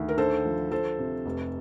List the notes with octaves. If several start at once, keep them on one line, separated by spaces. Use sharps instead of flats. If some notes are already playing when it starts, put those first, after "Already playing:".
Already playing: D2 D#3
A#4
D3 A4 C5
F3
F3 A4 C5
C3
F1